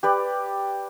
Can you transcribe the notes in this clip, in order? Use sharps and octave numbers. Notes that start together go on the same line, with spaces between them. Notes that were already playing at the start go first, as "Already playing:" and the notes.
G4 B4 D5